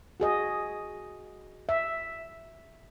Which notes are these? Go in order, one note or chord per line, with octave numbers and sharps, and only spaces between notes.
F#4 G#4 D#5
E5